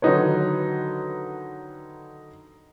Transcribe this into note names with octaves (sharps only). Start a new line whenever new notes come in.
D3 D#3 F#3 D#4 B4 C#5